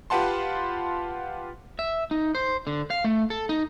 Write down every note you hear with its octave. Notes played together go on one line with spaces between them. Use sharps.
F4 G4 B4 F#5 A5 C6
E5
D#4
C5
D3
F5
A3
A4
D#4